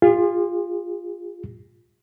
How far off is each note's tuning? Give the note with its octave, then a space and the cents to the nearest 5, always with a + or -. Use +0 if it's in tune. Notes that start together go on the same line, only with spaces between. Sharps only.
F4 +0 G#4 -45